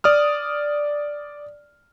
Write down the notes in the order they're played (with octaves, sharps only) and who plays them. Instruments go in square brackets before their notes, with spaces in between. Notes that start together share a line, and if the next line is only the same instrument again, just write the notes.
[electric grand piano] D5 D#6 F6